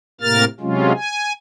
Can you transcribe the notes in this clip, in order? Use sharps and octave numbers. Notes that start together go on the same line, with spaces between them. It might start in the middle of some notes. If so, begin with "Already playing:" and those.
A2 C3 A#3 A#4 F6 A6
C3 F#3 G#3 C#4 F4
G#5